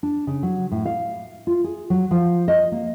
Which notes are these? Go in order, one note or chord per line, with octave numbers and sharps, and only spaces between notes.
D4
C#3
F#3
A2
F5
F4
G#4
F#3
F3
D#5
A#3